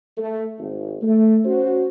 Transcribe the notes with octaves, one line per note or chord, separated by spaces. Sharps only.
A3
G#1
A3
C#4 F#4 C5